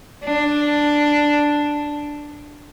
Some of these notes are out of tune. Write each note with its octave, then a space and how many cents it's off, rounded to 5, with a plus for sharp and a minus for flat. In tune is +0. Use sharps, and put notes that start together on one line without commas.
D4 +0